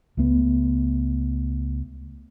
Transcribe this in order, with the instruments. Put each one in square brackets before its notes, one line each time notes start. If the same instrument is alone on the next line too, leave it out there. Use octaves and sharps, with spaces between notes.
[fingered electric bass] C#2 A3 B3